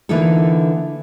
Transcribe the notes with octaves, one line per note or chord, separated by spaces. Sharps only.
D3 E3 A#3 D#4 F4 A4